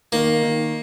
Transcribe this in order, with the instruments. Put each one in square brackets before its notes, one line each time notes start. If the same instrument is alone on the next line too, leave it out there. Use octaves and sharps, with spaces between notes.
[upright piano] D#3 [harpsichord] A#3
[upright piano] D#3